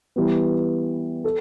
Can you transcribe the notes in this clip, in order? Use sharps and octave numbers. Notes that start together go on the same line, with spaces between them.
E3 G3 B3
A4